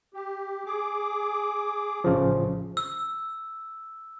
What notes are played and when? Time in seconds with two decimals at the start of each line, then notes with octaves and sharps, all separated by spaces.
0.14 G4
0.66 G#4 D6
2.04 A1 C#3 F3
2.77 E6